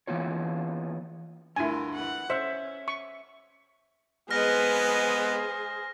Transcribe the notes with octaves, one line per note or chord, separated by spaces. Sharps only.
E3 A#3 B3 F4 C#5
D2 G2 E4 F4 A#4 G#5
E3 F#5
C#4 C5 E5 C#7
C#6
G#3 B3 G#4 B4 C5 D#5 F6 A#6